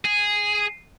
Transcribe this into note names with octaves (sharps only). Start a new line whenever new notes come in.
G#4